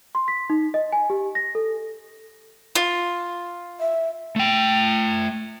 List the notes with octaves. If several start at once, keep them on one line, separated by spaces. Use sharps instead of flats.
C6
B6
D#4
D#5
G#5
G4
A#6
A4
F4
E5
A3 G5